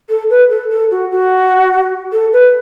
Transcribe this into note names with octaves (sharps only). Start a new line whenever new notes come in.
A4
B4
A4
A4
F#4
F#4
A4
B4